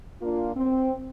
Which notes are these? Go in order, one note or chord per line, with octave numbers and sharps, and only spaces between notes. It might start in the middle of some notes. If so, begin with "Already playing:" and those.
A#3 D4 F4
C4